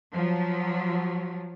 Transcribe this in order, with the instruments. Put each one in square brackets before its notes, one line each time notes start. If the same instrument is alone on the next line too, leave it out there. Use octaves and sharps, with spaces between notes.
[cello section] F3 F#3